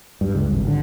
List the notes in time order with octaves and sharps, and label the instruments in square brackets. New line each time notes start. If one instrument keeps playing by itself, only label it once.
[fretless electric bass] G2
C#2
G#1
D3